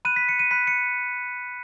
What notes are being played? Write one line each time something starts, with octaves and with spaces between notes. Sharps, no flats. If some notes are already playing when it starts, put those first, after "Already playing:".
B5 F#6 D#7
B6
C#7
D#7
B5 F#6 B6
C#7